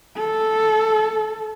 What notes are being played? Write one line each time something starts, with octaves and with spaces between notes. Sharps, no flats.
A4